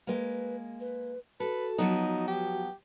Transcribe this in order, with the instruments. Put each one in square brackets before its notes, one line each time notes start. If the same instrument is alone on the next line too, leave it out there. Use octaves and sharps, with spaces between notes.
[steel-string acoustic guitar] G#3 A#3 [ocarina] B4
[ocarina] B4
[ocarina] F#4 [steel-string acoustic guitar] A4 [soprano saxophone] B4
[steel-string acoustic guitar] F3 F#3 B3 [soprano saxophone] D#4
[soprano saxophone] G4